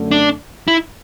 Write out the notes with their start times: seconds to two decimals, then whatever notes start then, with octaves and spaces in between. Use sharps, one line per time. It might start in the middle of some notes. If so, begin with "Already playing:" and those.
Already playing: F#2 D3 A3
0.11 D4
0.68 E4